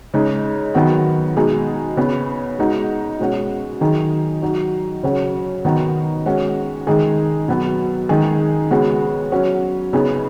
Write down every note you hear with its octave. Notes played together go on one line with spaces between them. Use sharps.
C#3 G#3 D#4
D#3 F#3 B3 F#4
B2 G#3 D#4 G#4
C#3 B3 G#4
G#3 D#4 F#4
B2 G#3 C#4 F#4
D#3 F#3 D#4 G#4
F#3 D#4 F#4
C#3 F#3 C#4 F#4
D#3 B3 D#4 F#4
G#3 C#4 F#4
D#3 G#3 D#4 G#4
B2 F#3 B3
D#3 G#3 D#4 G#4
C#3 G#3 B3 F#4
F#3 C#4 F#4
C#3 B3 D#4 G#4